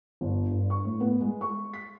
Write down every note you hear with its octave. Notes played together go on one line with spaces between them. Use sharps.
G1
G2
C#6
A2
B3
G#3
C#6
B6